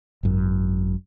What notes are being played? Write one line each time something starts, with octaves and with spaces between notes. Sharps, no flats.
G#1 F#2